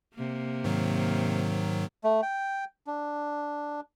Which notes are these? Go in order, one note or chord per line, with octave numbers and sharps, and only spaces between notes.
C3 A#3
G#2 D#3 F#3
A3
G5
D4